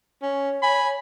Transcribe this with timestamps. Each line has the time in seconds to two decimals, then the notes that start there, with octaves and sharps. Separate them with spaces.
0.22 C#4 C#5
0.62 G#5 B5